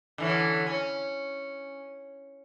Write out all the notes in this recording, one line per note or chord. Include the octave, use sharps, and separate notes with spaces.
D3 E3 C#4
C#4